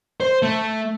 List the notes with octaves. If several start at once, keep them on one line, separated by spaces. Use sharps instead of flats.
C5
A3